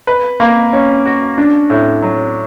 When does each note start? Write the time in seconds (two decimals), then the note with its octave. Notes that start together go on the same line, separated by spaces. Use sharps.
0.07 B4
0.40 A#3
0.73 C#4
1.06 F#4
1.38 D4
1.70 A2
2.03 F#3